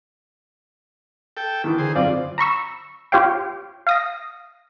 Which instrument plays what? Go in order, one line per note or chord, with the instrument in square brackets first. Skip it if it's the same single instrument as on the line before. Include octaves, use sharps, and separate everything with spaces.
[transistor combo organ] A4 G5
[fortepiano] D#3 E3
[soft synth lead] D3 [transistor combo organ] G#4 C5
[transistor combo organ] F#2 [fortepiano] C4 F4 D5
[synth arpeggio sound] A#5 B5 C#6 E6
F4 G4 C#5 F5 G5
F5 D#6 A#6